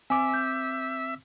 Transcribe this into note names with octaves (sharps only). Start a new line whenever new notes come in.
C4 E5 G#5 D6
G6